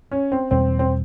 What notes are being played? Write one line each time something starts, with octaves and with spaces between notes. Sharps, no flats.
C#4
C4
E2 B2 G3 C4
C4